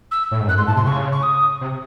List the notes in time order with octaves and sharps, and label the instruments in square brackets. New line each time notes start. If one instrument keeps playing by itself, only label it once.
[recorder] E6
[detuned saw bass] A2
G#2
[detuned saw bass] F#2 [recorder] F#6
[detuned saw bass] G#2 [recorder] C6
[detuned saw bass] A2 [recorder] A5
[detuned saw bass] C3 [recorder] C6
[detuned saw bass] C#3 [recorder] C#6
[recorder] C#6
D#6
[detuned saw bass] C3